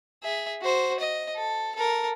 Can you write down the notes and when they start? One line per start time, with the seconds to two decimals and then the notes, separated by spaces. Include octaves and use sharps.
0.23 G#4 E5
0.62 F#4 C5
1.00 D#5
1.36 A4
1.75 A4 A#4